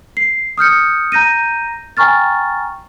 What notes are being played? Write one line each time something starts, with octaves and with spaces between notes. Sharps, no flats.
C7
D#6 F6 G6 C#7
A#5 G6 A#6 D#7
G5 G#5 A#5 C#6 F6 A6